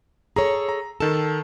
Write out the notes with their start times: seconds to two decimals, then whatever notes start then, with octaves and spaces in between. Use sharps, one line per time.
0.36 G#4 A4 C#5 A#5
0.69 A#5
1.00 D#3 A4 A5